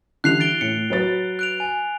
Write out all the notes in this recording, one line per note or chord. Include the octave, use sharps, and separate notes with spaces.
D3 E3 G3 F#6 C7 F7
A6 D7 G7
A2 C#7
F#3 B4 A6
F#6 D7 F7
G#5